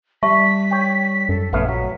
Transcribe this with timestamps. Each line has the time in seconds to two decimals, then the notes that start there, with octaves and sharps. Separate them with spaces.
0.23 G3 E5 A5 C#6 B6
0.71 C#5 G5
1.29 F#2 A4
1.53 A#1 A3 B3 C#4 F5
1.69 F#3 B6